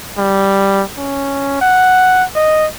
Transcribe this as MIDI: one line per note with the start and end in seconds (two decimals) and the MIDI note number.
0.18 0.83 55
0.98 1.59 61
1.61 2.24 78
2.35 2.67 75